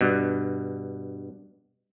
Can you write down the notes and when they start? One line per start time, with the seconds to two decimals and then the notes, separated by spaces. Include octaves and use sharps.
0.01 G2 B2